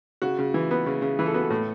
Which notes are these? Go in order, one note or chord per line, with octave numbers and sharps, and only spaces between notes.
C#3 F#4
C#3
E3
B3
C#3
C#3
E3 B4
A4
B3 F#4
A4
A2